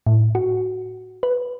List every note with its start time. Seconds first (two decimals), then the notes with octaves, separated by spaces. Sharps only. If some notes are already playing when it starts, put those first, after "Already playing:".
0.07 A2
0.35 F#4
1.23 B4